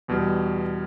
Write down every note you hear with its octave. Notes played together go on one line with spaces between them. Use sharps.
E2 B2 G3